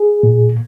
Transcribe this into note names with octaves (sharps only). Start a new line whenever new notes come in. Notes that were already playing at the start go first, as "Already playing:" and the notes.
Already playing: G#4
A#2